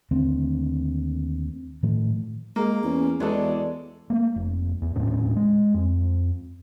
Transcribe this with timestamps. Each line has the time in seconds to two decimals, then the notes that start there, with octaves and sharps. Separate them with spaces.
0.11 D#2 D3 A3 C4
1.83 A2 D#3 F3 A3
2.56 G#3 A#3
2.84 E2 C#4
3.20 E2 E3 F#3 G#3 D4 G#4 A4
4.10 A3 A#3
4.36 F1
4.82 E2
4.95 D#1 A2 C#4 D4
5.36 G#3
5.74 F2